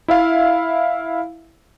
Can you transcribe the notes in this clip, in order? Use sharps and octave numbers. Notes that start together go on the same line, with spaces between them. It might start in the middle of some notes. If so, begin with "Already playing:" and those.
E4 E5 F5